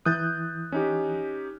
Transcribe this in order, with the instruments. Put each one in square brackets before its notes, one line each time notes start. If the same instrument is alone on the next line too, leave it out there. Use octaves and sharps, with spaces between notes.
[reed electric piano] E3 D#6 [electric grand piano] F#6 G6 A6
[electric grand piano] C#4 D#4 G4